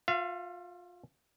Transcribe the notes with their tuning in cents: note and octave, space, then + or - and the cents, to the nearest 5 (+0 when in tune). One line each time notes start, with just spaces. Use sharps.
F4 +25 F5 -45